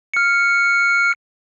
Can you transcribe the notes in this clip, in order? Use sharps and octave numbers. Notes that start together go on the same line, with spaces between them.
F6 C#7